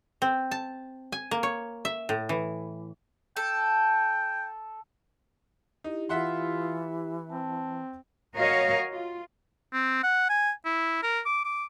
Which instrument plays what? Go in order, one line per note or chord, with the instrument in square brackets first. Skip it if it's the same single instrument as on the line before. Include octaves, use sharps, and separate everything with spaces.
[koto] C4
A5
G#5
A#3
C#5
E5
A2
E3
[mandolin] A4 [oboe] G5
[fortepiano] D#4 [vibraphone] E4 G4
[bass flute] E3 [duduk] F4 [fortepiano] E5 F#5 C6
[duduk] C4 [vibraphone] A5
[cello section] F#4 A#4 C#5 D#5 F5
F4
[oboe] C4
F#5
G#5
E4
A#4
D6
D6